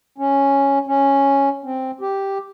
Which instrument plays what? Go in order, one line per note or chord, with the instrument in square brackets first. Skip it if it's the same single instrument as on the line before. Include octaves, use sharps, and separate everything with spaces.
[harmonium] C#4
C#4
C4
G4